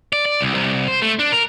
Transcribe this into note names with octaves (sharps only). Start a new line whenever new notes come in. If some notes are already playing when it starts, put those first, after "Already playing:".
D5
D5
C2
C2
C5
A3
D4
A#4